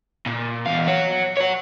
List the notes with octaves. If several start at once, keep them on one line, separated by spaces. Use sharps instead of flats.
A#2
E2 F5
C#5 F#5
C#5 F#5